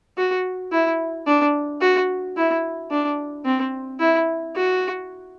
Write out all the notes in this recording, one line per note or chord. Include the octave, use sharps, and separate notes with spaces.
F#4
E4
D4
F#4
E4
D4
C4
E4
F#4